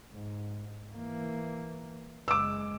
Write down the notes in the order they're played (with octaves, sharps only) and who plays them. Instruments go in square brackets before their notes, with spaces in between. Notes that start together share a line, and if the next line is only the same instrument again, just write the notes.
[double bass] G#2
E3 A#3
[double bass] F#1 G#3 [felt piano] D6 E6